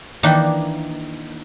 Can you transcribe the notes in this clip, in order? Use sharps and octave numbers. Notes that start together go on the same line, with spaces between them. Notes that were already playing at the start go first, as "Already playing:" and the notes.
D#3 E3 A#3 D4 D#4